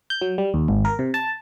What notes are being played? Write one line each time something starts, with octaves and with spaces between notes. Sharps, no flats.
G6
F#3
G3
D#2
G#1
A#4
C3
A5